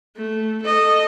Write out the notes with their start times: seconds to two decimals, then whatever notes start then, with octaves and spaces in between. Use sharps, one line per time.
0.17 A3
0.62 A4 D#5